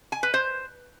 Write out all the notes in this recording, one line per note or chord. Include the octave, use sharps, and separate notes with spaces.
G#5
B4
C5